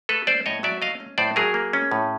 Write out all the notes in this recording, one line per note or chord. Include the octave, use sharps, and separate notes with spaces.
A3 A4 B4
C#4 C5 D5
A2 C#5 D#5
F#3 D5 E5
A3 D#5 F5
C#4
A2 C5 D5
F#3 G#4 A#4
A#3
C#4
A2